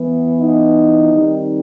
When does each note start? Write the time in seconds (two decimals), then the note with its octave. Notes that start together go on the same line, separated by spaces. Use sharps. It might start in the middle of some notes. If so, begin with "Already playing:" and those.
Already playing: E3 B3
0.41 D#4
1.12 D#3 G3 C4